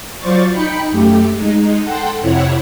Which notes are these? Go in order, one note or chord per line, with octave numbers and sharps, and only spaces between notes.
F#3 F4 C5 D5 C#6 A6
D#4 G5 B5 C#7
F#2 A3 G4
G#3 D#4
A4 F#5 G5 C6
F2 C3 E4 C#5 F#5